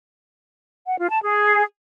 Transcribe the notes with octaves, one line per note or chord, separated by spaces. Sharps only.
F#5
F4
A5
G#4